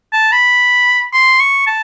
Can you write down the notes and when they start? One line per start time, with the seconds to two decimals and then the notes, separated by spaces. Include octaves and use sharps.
0.12 A5
0.32 B5
1.13 C6
1.40 C#6
1.67 A5